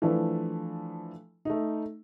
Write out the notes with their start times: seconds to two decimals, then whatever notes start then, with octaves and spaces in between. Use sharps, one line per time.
0.02 E3 F3 A3 D4 E4
1.45 A3 D#4